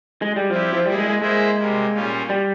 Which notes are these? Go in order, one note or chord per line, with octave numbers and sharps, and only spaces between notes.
G#3
G3
F3 C4 E4 G4
F3
G3 A#3 E4 G#4
G#3
G#3
G#3 A#3 E4 G#4 C5 E5
C3 G3 A#3
A#2 G3 A#3 C#4 F4
G3